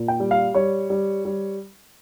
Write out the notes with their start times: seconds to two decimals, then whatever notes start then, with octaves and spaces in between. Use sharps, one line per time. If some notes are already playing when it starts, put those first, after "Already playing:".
Already playing: A#2
0.08 G5
0.20 G3
0.31 F5
0.54 G3 C#5
0.90 G3
1.25 G3